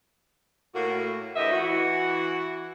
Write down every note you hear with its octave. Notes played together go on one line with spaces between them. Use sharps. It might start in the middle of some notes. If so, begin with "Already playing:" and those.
A2 A#3 F#4
D2 A2 E3 G4 D#5 E5
E3 F#4